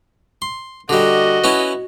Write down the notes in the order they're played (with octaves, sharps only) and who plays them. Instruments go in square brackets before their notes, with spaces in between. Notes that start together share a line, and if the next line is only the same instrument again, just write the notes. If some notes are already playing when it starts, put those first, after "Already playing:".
[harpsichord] C6
[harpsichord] D3 G3 [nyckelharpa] F#4 D#5
[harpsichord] B3 C#4 E4